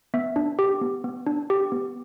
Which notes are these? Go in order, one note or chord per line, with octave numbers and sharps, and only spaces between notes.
B3 E5
D4
G4
B3
B3
D4
G4
B3